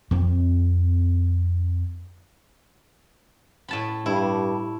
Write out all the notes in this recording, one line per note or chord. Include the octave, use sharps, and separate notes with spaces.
F2 C4
A2 A5 B5
G2 E4